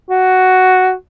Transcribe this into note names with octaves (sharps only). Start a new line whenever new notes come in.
F#4